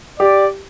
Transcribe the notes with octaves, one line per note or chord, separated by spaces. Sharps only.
G4 D5